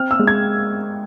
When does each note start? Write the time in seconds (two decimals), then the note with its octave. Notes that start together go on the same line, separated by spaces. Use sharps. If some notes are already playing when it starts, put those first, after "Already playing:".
Already playing: C4 F6
0.11 E6
0.19 G#3
0.27 G#6